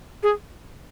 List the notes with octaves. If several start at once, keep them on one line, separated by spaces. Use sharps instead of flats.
G#4